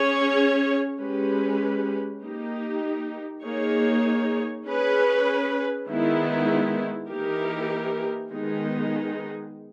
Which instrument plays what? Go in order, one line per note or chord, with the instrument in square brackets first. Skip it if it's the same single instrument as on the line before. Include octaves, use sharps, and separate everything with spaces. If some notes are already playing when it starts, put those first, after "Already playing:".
Already playing: [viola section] C#4 G#4 C#5
G#3 C#4 G4 B4
A#3 D#4 G4
A#3 D#4 G#4 C#5
C#4 G#4 B4
D#3 G#3 B3 E4
E3 A#3 D#4 G4 A#4
D#3 G#3 B3 D#4 G#4